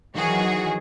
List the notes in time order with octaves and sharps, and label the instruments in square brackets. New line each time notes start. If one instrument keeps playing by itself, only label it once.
[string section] D#3 E3 F#3 F#4 G#4